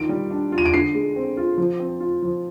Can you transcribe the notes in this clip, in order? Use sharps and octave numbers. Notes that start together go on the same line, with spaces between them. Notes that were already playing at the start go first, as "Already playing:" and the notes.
Already playing: D#3 D4 F4 D7
G3
D4
F4
D#7
D7
D3 C7
G#3
C4
F4
F3
C4
F4
F3